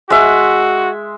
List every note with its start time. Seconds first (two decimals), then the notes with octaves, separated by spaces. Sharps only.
0.10 G#3 F#4 E5